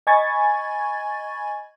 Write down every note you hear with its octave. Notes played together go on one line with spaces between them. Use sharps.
D#5 G#5 B5 C#6 G#6 A6